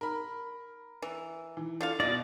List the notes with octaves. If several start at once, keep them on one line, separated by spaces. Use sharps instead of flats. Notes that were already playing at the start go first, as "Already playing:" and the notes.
A#4 B5
E3
E3
D3 F4 F5
B2 F4 D5 D#5